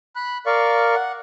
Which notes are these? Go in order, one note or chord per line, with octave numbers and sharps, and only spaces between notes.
B5 F#6
A#4 D5 F5 C#6
F#5